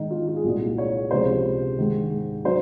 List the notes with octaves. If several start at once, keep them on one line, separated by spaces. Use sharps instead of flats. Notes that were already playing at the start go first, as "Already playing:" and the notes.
Already playing: G#2 D#3 G#3 D#4
F4
F4
G#4
C2 A#2 G#3 F#4
C#5
C#2 C3 F3 G#3 C5
G#2 D#3 G#3
F#3 C5